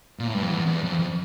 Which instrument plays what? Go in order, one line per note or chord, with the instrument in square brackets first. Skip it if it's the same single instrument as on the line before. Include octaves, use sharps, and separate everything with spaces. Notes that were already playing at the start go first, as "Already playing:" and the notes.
[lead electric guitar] A#2
A2
G2
F2
E2
E2
F2
F2